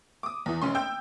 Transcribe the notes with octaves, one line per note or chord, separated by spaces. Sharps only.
D6 D#6
E2 E3
F1 C#4 C6
G5 E6 G6